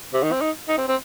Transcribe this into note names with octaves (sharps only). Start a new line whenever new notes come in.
C3
D#3
C4
D#4
D#4
C4
C4